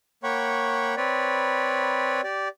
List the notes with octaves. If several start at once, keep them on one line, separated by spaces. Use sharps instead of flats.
A#3 C#5 F#5 G5 B5 C#6
C4 B4 C#5 D5 B5
G4 D5